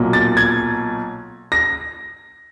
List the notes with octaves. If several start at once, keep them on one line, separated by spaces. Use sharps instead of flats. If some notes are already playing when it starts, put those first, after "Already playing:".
Already playing: B1 A#2 F#3
A6
G#6
A#6